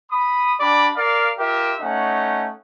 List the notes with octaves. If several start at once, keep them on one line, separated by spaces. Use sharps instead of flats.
B5 D#6
D4 G4 D5 B5
A#4 D5 F5
F4 G4 A#4 E5
A3 C#4 D#4 F#5